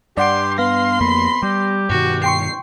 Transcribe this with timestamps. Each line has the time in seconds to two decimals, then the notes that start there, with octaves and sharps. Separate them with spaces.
0.17 G2 G4 D5 F#5 C6 D6
0.58 B3 F5 C6 A#6
1.00 F2 A#3 B5
1.43 G3 G4
1.90 G2 B2 D#3 F#4
2.24 G5 C6 C#6 C7